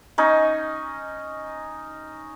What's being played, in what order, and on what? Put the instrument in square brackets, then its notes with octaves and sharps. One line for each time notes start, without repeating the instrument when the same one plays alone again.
[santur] C#4 D#4